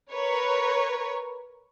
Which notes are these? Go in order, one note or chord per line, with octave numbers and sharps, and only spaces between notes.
A#4 B4 C#5